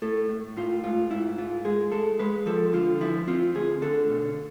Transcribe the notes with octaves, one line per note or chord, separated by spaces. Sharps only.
A2 A4
A2
A2 F4
G#2 F4
G#2 E4
G#2 F4
G#3 G#4
G#3 A4
G#3 B4
F3 A4
D3 F4
F3 E4
C4 F4
D2 G#4
D3 A4
B2